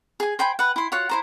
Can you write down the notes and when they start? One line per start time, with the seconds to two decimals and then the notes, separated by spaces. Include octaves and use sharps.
0.20 G#4 G#5
0.39 C5 G5 G#5 B5
0.59 B4 F#5
0.76 E4 C6
0.92 F4 F#4 C#5 F#5
1.09 E4 C5 A#5